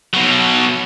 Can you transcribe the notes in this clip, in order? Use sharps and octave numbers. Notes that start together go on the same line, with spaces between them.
B2 F#3